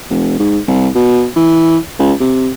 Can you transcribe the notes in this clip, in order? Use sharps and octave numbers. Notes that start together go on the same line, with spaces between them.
F1
G#2
C2
B2
E3
C#2
C3